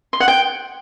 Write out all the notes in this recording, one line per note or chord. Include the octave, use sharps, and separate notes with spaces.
C6
F#5
G5